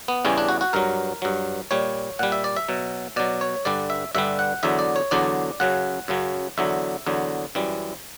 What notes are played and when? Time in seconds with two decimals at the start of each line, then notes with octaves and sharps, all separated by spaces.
0.08 B3
0.25 E2 C#3 E3 G3 C#4
0.38 D4
0.49 F#4
0.61 F#4
0.73 G2 F#3 A#4
1.22 G2 F#3
1.71 A#2 G3 C#5
2.19 A#2 G3 F#5
2.32 E5
2.44 D5
2.56 E5
2.69 B2 F#3
3.16 B2 F#3 D5
3.41 C#5
3.65 G2 D3 G3 D5
3.90 E5
4.15 G2 D3 G3 E5
4.39 F#5
4.63 E2 D3 F#3 E5
4.79 D5
4.96 C#5
5.11 E2 D3 F#3 D5
5.60 F#2 C#3 F#3 F#5
6.08 F#2 C#3 F#3
6.58 E2 D3 F#3 E5
7.07 E2 D3 F#3
7.55 F#2 E3 G3